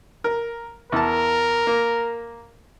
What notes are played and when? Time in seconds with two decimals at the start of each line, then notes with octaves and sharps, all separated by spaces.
0.24 A#4
0.92 E2 A#4 A5
1.67 A#3